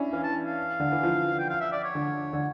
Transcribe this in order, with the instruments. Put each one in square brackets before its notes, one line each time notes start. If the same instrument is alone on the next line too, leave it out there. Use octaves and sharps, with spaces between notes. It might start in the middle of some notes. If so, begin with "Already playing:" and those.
Already playing: [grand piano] C#4 D4 E4
[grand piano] E3 [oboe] F5
[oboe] A5
F5
[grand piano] D3
E3
F3
[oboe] G5
F5
E5
D5
C#5
[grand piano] D3
D3